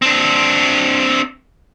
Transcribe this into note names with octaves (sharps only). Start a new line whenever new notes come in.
C4 D4